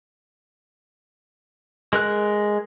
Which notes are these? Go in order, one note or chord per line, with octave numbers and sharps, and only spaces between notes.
G#3 A#4 F#6